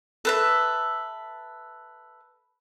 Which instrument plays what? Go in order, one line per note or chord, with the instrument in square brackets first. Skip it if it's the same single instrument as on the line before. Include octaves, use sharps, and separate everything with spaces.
[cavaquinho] A4 B4 E5